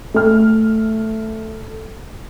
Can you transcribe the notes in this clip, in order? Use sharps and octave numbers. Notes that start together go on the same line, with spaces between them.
A3 F6